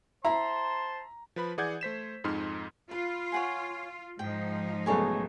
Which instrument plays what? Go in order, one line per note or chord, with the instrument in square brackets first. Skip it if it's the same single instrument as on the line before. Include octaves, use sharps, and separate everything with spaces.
[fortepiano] E4 [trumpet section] C5 A5 C6 [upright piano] A#5
[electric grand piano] F3 B4 B5
E3 G#4 D5 F#5 G6 G#6
A3 C5 B6 E7
F2 G#2 D#4 C6 F6
[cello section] F4 [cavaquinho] B4
[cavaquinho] C#5 F#5 G#5
[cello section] G#2 F3 D#4 [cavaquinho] G5
[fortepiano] B1 C#3 A3 [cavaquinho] A4 C#5 G#5